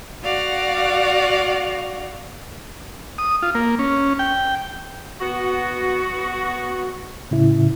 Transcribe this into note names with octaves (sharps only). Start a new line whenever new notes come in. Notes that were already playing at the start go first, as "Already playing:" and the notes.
F#4 D5 F5 F#5
D#6
F4
A#3
C#4
G5
B3 F#4
A2 C#3 E4